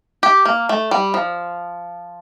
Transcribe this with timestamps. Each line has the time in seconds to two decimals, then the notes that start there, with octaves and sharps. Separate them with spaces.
0.23 G4
0.45 A#3
0.69 A3
0.91 G3
1.14 F3